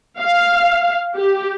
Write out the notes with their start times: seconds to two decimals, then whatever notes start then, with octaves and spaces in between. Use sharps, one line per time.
0.20 F5
1.16 G4